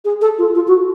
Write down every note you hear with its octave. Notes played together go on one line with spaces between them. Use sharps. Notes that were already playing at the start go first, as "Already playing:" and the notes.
G#4
A4
F4
F4
F#4